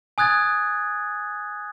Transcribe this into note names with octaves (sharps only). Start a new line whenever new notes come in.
G#5 D#6 F#6 G#6 A6